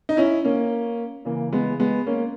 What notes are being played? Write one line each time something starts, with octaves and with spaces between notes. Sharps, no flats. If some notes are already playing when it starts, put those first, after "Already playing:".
D#4
C#4 E4
A#3 C#4
C#3 E3 A#3
G#3 B3
G#3 B3
A#3 C#4